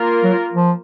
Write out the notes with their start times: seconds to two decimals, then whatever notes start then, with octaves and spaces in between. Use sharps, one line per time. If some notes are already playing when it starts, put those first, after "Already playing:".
Already playing: A#3 F4 A#4
0.23 F#3
0.53 F3